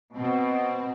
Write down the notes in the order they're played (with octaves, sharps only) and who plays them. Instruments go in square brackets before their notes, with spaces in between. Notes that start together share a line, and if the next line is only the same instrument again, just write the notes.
[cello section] B2 [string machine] C4